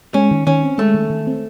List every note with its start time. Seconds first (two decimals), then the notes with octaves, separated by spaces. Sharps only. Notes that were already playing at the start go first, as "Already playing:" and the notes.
0.14 G#3 C#4
0.31 D#3
0.47 D#3 C#4
0.63 C4
0.78 G#3 A3
0.94 D#3
1.10 D#3
1.27 C4